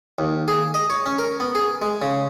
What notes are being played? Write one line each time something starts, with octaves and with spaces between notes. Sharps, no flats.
D#2
G#4
D#5
C#5
C#4
A#4
B3
G#4
G#3
C#3